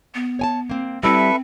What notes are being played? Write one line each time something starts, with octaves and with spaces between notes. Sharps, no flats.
B3
C#5 G#5 A5
A#3 C4
G3 C4 E4 A4 B4 E5